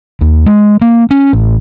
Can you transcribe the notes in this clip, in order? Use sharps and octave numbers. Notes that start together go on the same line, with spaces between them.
D#2
G#3
A#3
C#4
A1